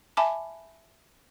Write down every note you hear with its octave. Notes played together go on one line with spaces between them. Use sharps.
E5 G#5 A5 B5 D6